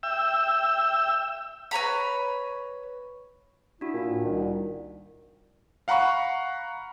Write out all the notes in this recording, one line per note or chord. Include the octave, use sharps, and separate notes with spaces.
E5 G5 E6
B4 C#5 A#5 B5
D4 E4 F#4
A#2
A2
C2 D#3
F5 F#5 A#5 B5 C#6